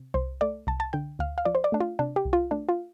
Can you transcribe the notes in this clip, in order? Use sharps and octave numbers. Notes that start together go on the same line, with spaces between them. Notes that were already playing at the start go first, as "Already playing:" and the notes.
Already playing: C3
C2 C5
A3 D5
C2 A5
A5
D3 G5
D2 F5
F5
F3 D5
C5
D5
A3 D4
F4
C3 D4
G4
C2
F4
A3 D4
F4